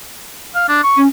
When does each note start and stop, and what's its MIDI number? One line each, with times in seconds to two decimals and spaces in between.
0.55 0.68 77
0.69 0.82 62
0.84 1.01 85
0.97 1.06 61